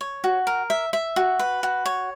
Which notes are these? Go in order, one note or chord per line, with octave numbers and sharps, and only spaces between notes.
C#5
F#4
A#4
E5
E5
F#4
B4
F#4
C#5